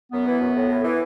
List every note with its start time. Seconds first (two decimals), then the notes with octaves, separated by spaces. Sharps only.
0.12 F#2 B3
0.27 E3
0.41 F#2
0.55 A2
0.69 A2
0.84 E3